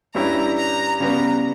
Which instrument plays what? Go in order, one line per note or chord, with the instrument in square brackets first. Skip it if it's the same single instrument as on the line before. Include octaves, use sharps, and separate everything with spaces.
[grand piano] G2 G3 C#4 E4 [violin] A#5
[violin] A#5
[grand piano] C#3 G3 B3 [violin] A#5